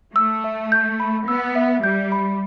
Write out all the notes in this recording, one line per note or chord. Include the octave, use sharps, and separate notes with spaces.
A3 E6
E5
G6
B5
B3 E6
E5
G3 G6
B5